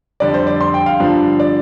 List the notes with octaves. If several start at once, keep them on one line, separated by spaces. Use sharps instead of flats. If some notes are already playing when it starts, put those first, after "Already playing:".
F2 D3 G3 D5
C5
D5
C6
G5
F5
G2 D3 F3 D4
D5